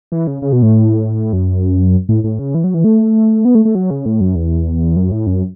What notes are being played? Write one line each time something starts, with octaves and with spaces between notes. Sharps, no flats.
E3
C#3
C#3
B2
A2
F#2
A2
A2
C#3
E3
F#3
E3
A3
B3
A3
A3
F#3
C#3
A2
F#2
E2
F#2
A2
F#2